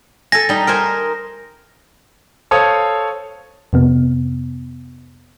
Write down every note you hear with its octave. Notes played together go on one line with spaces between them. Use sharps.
A4 G#5 A#6
G3 D#4
A#4 C5 G#5
A4 C5 C#5 F5 D#6
F2 C3 B3